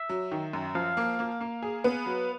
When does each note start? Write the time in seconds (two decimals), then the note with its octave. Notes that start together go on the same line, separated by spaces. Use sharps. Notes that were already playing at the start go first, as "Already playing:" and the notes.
Already playing: E5
0.09 F#3
0.31 D#3
0.53 F#2
0.75 F3 F5
0.97 A#3
1.19 A#3
1.40 A#3
1.62 G#4
1.84 B3
2.06 F#3